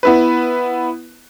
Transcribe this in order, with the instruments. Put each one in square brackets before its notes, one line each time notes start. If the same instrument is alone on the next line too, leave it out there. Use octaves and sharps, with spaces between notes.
[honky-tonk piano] B3 E4 B4